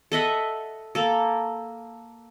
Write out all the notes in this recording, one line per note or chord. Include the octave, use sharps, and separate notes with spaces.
A4 D#5 E5 F#5
A#3 A4